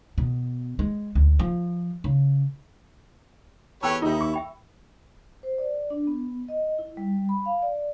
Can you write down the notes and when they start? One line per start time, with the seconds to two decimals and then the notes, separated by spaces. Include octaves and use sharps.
0.18 B2
0.79 G#3
1.15 D2
1.39 F3
2.04 C#3
3.83 E2 G4 A4 B4 C#5 G5 A5 E6
4.02 D#2 D#4 E4 G4
4.21 C#6
4.34 E5 G5 B5
5.43 C5
5.58 D5
5.90 D4
6.07 B3
6.49 D#5
6.79 E4
6.97 G3
7.29 B5
7.46 F5
7.62 D5